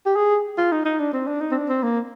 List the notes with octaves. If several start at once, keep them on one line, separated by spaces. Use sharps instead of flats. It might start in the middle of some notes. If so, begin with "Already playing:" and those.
G4
G#4
F4
D#4
D#4
D4
C4
D4
D#4
C4
D4
C4
A#3